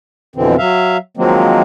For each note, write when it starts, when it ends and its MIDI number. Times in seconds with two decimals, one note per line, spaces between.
0.36 0.56 41
0.36 0.56 47
0.36 0.56 50
0.36 0.56 52
0.36 0.56 60
0.58 0.97 54
0.58 0.97 76
0.58 0.97 77
1.17 1.62 51
1.17 1.62 53
1.17 1.62 54
1.17 1.62 56
1.17 1.62 58
1.17 1.62 60